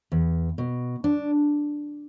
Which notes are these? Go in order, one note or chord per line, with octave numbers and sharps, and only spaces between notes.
E2
B2
D4